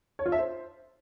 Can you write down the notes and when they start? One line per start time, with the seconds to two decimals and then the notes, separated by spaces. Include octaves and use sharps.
0.19 C#5
0.26 F4
0.32 E5
0.39 C5